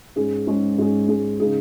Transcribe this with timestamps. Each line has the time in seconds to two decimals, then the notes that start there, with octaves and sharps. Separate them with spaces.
0.16 G#2 G#3 C#4 G#4
0.47 G#2 G#3 C#4 G#4
0.78 G#2 G#3 C#4 G#4
1.09 G#2 G#3 C#4 G#4
1.40 C#3 G#3 D#4 G#4